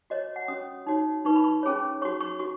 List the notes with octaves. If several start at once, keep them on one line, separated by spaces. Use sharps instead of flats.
F#4 C#5 D#5
D#5
F#5
C#4 F#4 C#5 D#6
D#4 F#4 C#5
D#4 B4 C#6
B5
C#6
C#4 G#4 C#5
F#4 C#5 C#6
C#6
F#4 C#6